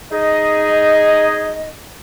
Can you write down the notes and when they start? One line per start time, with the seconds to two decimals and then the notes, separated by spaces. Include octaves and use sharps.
0.12 D#4 G#4 D#5